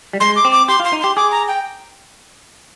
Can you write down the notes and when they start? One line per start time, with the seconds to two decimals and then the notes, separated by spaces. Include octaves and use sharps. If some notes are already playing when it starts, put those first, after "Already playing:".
0.13 G3
0.20 G#3 C6
0.36 D6
0.45 C4
0.52 D6
0.68 G4 C6
0.80 F4
0.84 C6
0.93 D#4
1.01 G4 C6
1.16 G#4 D6
1.31 A#5
1.48 G5